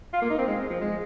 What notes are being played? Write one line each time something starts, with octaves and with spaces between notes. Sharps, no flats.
F4
A#3
D#4
C4
G#3
F3
G#3